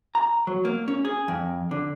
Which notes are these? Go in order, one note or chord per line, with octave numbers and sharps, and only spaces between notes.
A#5
F#3
A#3
C#4
G#4
F2
D3